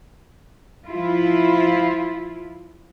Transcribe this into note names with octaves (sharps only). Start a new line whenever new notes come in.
F3 E4 F4